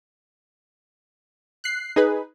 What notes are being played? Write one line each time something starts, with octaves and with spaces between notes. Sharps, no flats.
F#6 C7
D#4 G#4 B4